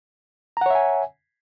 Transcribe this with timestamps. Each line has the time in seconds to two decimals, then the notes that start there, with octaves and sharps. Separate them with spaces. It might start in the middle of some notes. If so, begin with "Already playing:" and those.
0.57 A#5
0.61 F#5
0.66 C#5
0.70 E5
0.75 G#5